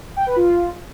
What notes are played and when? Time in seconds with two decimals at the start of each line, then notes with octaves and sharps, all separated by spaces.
0.17 G5
0.26 B4
0.36 F4